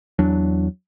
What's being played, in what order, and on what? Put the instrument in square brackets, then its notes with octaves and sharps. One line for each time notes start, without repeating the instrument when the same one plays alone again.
[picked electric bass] E2 F#3 D4